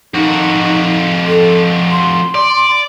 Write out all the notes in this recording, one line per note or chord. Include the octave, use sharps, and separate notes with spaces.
F2 D#4 F#4
A4
C6
D5